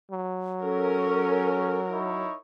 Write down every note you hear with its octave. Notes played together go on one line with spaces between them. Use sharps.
F#3
C#4 A4 A#4
D#4 E4 C#5